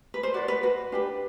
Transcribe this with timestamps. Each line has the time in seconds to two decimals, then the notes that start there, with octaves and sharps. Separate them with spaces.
0.14 B4
0.23 C5
0.34 F#4 B4 D5
0.48 B4
0.63 F#4 B4
0.92 D4 G4 B4